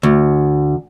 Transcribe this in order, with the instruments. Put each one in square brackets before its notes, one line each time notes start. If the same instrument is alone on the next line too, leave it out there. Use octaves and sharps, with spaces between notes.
[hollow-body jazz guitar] D2